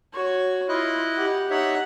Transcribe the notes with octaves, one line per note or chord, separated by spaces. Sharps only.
F#4 C#5
E4 F4 D#5 F#6
G4 F#5
D#4 C#5 E5 F#5